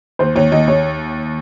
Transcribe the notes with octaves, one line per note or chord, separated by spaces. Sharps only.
D#2 C5
D#2 C#5
D#2 D#5
C#5